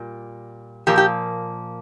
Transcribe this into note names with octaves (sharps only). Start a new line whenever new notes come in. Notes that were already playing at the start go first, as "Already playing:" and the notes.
Already playing: A#2 G3
A#2 F3 A#3 G4
G4